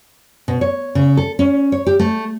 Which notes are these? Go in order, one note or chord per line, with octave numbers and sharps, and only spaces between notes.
B2
C#5
C#3
A4
C#4
C#5
G4
A3